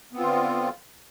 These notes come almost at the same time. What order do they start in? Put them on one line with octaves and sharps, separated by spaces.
B3 C4 F4 D3